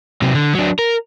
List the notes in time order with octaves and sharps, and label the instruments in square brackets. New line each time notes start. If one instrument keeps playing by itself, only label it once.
[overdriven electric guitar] C3 F#3
D3
F#3 D4
A#4